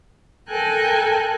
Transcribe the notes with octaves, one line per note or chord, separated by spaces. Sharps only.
A4 A#4 G5 G#5 F#6